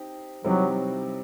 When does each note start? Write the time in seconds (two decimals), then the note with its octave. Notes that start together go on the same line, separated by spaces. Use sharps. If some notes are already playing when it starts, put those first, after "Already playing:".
Already playing: C4 D#4 G4
0.44 C3 E3 F#3 G3 C4 D#4